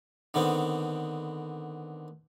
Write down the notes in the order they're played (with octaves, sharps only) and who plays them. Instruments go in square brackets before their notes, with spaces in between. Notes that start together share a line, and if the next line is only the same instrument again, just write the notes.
[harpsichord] D3 D#3 B3 C4